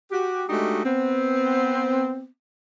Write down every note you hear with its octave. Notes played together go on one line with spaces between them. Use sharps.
F#4 G4
G#3 A3 D4 D#4 F#4 G4
B3 C4